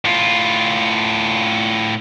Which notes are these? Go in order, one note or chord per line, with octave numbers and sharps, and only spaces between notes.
A2 F4